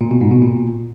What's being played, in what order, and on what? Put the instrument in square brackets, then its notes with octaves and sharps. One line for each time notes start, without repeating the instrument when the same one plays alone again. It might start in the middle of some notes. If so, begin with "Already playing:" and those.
[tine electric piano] A#2
B2
G#2
B2
A#2